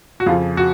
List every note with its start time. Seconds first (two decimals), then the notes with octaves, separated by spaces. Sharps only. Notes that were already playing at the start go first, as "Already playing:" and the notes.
0.20 F#4
0.26 F2 C#3 F3 F4
0.57 F#4